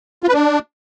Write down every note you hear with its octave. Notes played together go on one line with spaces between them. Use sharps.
F4
B4
D4